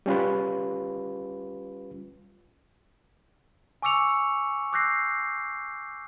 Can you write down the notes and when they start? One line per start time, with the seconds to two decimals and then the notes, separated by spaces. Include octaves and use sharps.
0.06 G3 C#4 F4 B4
3.82 G#5 C#6 D6 E6 C#7 F7
4.73 D6 E6 F#6 G6 A#6 C7